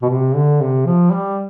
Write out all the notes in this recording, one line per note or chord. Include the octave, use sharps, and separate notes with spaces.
B2
C3
D3
C3
F3
G3